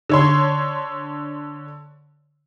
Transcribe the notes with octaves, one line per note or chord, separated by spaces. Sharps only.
D3 C#5 C6